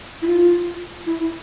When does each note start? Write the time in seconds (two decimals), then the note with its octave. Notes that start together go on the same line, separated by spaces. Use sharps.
0.22 E4
0.27 F4
1.06 E4